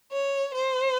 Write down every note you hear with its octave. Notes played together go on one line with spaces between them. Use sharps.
C#5
C5